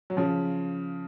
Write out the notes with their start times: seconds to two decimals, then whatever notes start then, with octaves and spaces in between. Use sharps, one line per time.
0.10 F#3
0.17 C#3 F3